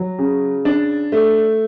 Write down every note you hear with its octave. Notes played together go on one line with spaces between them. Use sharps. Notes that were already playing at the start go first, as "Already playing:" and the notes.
Already playing: F#3
C#3
D4
A3